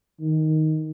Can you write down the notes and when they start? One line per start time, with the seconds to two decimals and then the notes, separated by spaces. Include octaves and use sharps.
0.20 D#3